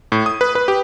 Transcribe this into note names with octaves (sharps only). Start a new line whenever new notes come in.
A2
D#6
B4
B4
G4